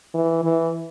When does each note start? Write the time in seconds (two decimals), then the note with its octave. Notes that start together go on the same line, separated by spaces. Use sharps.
0.14 E3
0.44 E3